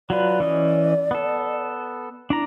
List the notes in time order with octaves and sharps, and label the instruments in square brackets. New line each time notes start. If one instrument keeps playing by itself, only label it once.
[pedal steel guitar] F#3 F4 B4 [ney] D5
[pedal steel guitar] E3 C#4 D#5
B3 A4
[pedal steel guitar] D4 D5 A#5 [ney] E4